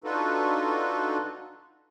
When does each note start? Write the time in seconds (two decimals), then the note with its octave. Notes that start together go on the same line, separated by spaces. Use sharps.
0.04 D4 D#4 F4 F#4 A4 B4